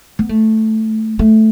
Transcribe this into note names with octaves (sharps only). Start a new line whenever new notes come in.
B3
A3
A3